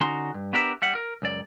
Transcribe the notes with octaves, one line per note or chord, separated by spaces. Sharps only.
D3 C#4 D#4 F#4 C6
G2
B3 D4 G4 A#4 B4 E5
G3 E5 F#5
A#4
C#2 F#2 D5